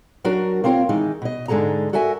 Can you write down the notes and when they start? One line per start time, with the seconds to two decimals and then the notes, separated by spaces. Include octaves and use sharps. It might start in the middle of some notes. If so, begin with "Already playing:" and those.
0.24 F#3 D4 F#4 A#4
0.64 A#3 C4 F4 A#4 C#5 G5
0.89 D#3 E3 G#3 D#4
1.22 B2 D#5
1.48 G#2 D3 G#3 G#4 A4 A#5
1.93 F#4 A4 A#4 E5 G#5